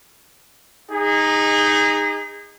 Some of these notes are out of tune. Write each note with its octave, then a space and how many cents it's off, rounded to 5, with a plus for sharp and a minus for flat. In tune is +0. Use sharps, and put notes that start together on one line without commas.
D#4 +0 G#4 -30